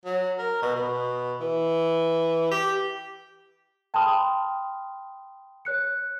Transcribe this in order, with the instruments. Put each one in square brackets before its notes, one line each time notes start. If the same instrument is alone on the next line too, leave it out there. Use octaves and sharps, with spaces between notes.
[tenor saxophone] F#3
A#4
B2
B2
E3
G4
[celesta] G5 A5 B5 C6 D#6 F6
C#5 F#6 C#7